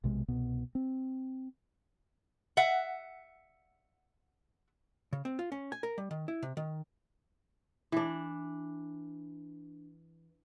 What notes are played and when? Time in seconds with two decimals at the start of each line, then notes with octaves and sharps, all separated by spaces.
0.04 B1 C3 G#3
0.28 C2 B2 B3
0.75 C4
2.57 E5 F#5
5.13 C#3
5.25 C4
5.39 F4
5.52 C#4
5.72 G#5
5.83 A#4
5.98 G3
6.11 D#3
6.28 E4
6.43 C3
6.57 D#3
7.92 E3 D4